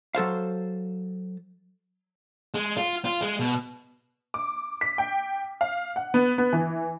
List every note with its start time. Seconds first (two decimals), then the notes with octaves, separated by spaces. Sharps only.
0.15 F#3 A4 C5 F5
2.54 G#3
2.77 F4
3.05 F4
3.21 G#3
3.40 B2
4.34 D6
4.81 B6
4.98 G5
5.61 F5
5.96 F#5
6.14 B3
6.38 B3
6.53 E3